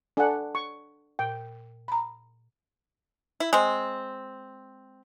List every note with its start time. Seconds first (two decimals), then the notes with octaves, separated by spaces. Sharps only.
0.17 D4 A4 F#5 G#5
0.55 C#6
1.19 A#2 G5
1.88 A#5 B5
3.40 E4
3.53 G#3 C4